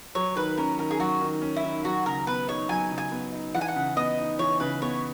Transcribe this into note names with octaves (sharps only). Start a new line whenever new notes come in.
F#3 C#5
D#3 B4
C#4 A#4
D#3 A#4
G#4
F#3 F#4
D#3
C#4
E4
D#3
F#3 F#4
C#3 A#4
B3 B4
D#4 C#5
F#3 G#5
C#3
G#5
B3
D#4
E3 F#5
G#5
F#5
C#3
B3 D#5
D#4
E3 C#5
C#3 B4
B3 C#5